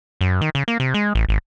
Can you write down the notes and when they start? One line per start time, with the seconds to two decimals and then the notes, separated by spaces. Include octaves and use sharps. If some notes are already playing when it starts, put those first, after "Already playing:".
0.21 F#2
0.41 D#3
0.55 C#3
0.68 A#3
0.80 C3
0.94 G#3
1.15 A1
1.29 G#1